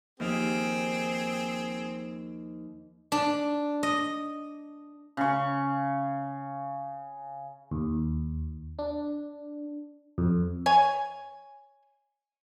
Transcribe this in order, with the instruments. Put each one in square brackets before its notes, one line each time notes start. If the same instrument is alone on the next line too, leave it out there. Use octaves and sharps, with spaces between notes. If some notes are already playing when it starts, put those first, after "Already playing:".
[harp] D#2 F3 F5 [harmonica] C4 G#4
[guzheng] D4
D#5
[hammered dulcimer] C#3 C#6
[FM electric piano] D#2
D4
F2
[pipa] C#5 G#5